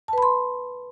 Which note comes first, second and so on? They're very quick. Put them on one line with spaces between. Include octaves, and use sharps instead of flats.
A5 B4 B5 C6